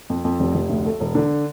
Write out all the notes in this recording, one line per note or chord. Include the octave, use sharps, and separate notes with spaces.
F2
F2
F1
F1
D2
A3
E1
D3